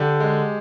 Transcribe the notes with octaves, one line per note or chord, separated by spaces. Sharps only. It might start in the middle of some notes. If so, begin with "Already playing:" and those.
Already playing: D3 G4
G#3